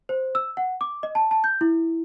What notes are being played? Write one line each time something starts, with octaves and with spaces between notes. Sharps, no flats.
C5
E6
F#5
D6
D#5
A5
A5
G6
E4